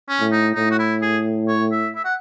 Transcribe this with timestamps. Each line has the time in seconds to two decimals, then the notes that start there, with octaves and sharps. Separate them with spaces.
0.09 C#4
0.20 A2
0.32 D#4
0.55 A2 D#4
0.71 F#4
0.79 E4
1.02 G#4
1.48 C#5
1.72 E5
1.95 E5
2.05 F#5